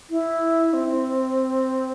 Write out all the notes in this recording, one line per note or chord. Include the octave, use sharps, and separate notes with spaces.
E4
C4